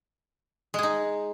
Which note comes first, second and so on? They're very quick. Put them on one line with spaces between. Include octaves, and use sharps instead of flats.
G#3 G#4 D#4